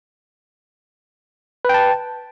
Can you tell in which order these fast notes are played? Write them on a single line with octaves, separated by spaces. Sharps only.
B4 G5 A5